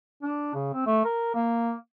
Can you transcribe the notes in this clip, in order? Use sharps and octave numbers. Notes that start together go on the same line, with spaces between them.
D4
C#3
C4
A3
A#4
A#3